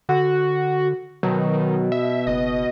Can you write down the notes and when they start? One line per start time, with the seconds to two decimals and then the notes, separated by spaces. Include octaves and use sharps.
0.09 D3 F#4
1.23 B2 D#3 F#3
1.92 E5
2.27 F#1 D#5